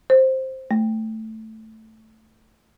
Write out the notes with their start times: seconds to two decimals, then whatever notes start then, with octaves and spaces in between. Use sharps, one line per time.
0.10 C5
0.71 A3